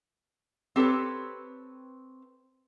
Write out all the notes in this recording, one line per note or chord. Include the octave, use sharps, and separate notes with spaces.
C4 G4 A4 B4 C#5